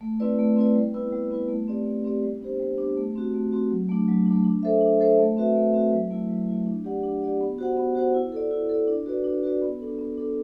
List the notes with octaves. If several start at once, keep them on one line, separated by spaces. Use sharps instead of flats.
A3
C4 E4 B4 D5
A3
C4 E4 B4 D5
G3
B3 E4 B4
G3
B3 E4 B4
A3
C4 G4 D5
A3
C4 G4 D5
G3
B3 D4 G4 C5
G3
B3 D4 G4 C5
A3
C4 F#4
A3
C4 F#4
F#3
A3 D4
F#3
A3 D4
D4
A4 C5 E5
D4
A4 C5 E5
A3
C4 F#4 B4 E5
A3
C4 F#4 B4 E5
F#3
A3 E4
F#3
A3 E4
D4
G4 D5 F#5
D4
G4 D5 F#5
B3
F#4 C5 F#5
B3
F#4 C5 F#5
E4
A4 D5
E4
A4 D5
D4
F#4 B4 D5
D4
F#4 B4 D5
B3
D4 A4
B3
D4 A4